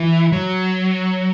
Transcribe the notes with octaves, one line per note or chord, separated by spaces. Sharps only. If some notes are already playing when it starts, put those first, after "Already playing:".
Already playing: E3
F#3